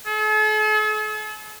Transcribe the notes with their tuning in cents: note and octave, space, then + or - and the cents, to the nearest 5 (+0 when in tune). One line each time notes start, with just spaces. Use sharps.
A4 -45